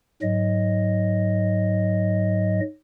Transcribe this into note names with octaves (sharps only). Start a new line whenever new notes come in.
G#2 F#3 D#5